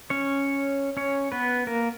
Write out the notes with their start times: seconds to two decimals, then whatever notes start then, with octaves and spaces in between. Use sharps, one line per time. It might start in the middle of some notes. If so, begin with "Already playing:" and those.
0.10 C#4 C#5
0.97 C#4 C#5
1.32 B3 B4
1.67 A#3 A#4